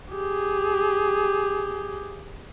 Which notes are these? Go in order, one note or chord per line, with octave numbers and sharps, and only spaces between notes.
G4 G#4